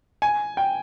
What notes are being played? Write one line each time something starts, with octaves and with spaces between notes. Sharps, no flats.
G#5
G5